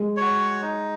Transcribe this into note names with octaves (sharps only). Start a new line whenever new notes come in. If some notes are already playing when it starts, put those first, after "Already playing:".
Already playing: G#3
F#4 C#5
D#4